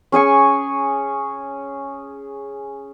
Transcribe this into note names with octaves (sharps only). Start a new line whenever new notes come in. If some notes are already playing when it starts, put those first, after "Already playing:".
C#4 G#4 G#5 C#6